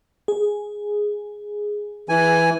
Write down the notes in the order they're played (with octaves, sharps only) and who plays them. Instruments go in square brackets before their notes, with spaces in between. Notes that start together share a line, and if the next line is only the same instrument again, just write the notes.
[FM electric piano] G#4
[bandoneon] E3 G#5